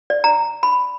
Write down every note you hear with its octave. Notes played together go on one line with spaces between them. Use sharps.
D5
A#5
B5